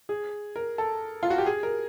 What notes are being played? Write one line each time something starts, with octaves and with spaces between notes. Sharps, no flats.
G#4
A#4
A4
F4
F#4
G4
G#4
A#4